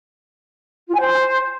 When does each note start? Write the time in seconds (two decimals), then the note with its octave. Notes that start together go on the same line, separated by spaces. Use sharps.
0.89 F4
0.95 G#5
1.00 C5